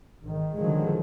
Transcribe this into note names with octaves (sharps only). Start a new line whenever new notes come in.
G#1 D#3
D3 D#3 F3 F#3 G#3